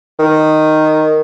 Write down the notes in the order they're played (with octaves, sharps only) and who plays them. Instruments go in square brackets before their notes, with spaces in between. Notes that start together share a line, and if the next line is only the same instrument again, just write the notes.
[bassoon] D#3